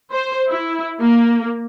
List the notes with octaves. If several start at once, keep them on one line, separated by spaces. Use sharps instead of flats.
C5
E4
A#3